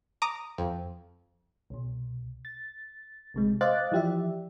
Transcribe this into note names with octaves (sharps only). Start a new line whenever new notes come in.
A#5 D6 D#6 D#7
F2
C2 B2
A6
A#1 C3 G#3
C5 D#5 F5 D6 F#6 A6
E3 F3 G4 D5 E5